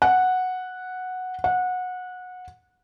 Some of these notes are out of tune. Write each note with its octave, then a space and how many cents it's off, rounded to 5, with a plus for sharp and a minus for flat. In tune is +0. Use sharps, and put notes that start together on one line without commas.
F#5 -5
F#5 -20